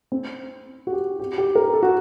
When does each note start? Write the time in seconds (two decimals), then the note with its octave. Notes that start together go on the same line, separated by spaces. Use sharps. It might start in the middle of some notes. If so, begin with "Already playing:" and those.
0.12 C4
0.87 F#4
0.93 G4
1.20 G4
1.38 G4
1.55 A#4
1.74 A4
1.83 F#4